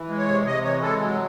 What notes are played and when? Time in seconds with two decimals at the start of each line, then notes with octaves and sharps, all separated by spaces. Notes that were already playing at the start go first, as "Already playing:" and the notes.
Already playing: E3
0.09 G#3
0.18 C#5
0.28 C3
0.45 C3 D#5
0.64 E3 C#5
0.82 G#3 A4
1.00 F#3